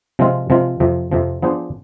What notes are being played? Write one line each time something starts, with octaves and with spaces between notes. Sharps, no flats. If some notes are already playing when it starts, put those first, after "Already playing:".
C3 F3 G#3 C4 F4
C3 F3 G#3 C4 F4
F2 C3 F3
F2 C3 F3
F3 B3 D4 G#4 C5